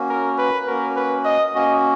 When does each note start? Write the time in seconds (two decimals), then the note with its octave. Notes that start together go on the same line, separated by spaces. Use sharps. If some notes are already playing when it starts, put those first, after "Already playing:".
Already playing: A#3 C#4 F#4
0.09 A#4
0.38 B4
0.67 A#3 C#4 F#4 A#4
0.96 B4
1.25 D#5
1.54 A#3 C#4 F#4 D#5